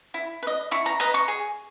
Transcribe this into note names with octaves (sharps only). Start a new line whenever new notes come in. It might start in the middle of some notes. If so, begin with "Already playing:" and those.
E4
B4
D#5
E4 C#6
A#5
B4 D#5 A#5
C#6
G#4